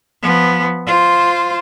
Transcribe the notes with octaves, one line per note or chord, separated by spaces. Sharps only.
F3 B3
F4 C5